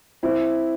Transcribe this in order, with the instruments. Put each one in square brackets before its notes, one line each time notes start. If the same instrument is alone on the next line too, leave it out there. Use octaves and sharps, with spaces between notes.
[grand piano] C4 E4